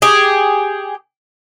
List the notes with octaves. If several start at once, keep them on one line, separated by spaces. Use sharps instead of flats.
G4 G#4